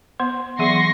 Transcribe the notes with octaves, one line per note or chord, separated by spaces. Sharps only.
B3 C5 C6
E3 F#3 B3 G#4 E5 C6 C#6 A#6